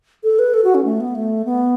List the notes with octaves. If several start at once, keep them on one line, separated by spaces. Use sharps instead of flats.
A4
B4
A4
F#4
C#4
A3
B3
A3
B3